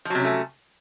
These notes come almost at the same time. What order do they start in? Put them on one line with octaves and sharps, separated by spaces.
F3 F#3 C3 C#4 A3